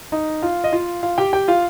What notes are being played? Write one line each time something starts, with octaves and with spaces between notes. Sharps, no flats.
D#4 D#5
F4 F5
D#5
F4 F5
F4 F5
G4 G5
G4 G5
F4 F5